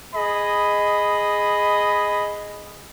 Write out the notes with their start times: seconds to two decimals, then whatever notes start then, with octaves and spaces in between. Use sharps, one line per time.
0.15 G#4 D#5 B5